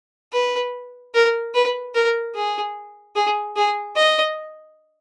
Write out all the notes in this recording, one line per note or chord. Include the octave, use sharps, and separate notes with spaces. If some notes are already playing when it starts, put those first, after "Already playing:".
B4
A#4
B4
A#4
G#4
G#4
G#4
D#5